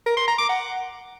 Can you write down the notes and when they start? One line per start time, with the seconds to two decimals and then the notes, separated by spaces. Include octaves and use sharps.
0.06 A#4
0.17 C6
0.28 A#5
0.38 D6
0.49 F#5